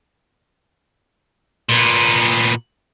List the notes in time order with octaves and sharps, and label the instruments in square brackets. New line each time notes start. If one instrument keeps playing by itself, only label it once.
[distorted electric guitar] A#2 B3